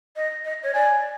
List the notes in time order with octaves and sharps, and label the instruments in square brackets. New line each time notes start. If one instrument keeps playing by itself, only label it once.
[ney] D#5
D#5
C#5
[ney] D5 [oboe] G#5